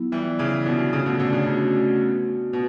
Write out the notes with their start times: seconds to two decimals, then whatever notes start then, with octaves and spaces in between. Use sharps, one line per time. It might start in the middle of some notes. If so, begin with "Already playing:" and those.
Already playing: F#3 B3 E4
0.12 E3 G3
0.39 C#3 E3 F#3 B3 E4
0.66 B2 D3
0.92 C#3 A3 C#4 F#4
1.06 B2 D3
1.19 B2 D3
1.33 C#3
1.46 C#3 A3 C#4 F#4
2.00 B3 F#4 B4
2.53 B2 F#4 B4